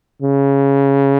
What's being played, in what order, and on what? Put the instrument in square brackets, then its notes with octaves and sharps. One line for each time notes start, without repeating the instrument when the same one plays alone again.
[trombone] C#3